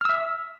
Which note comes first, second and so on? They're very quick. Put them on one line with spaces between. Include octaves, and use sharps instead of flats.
F6 E6 E5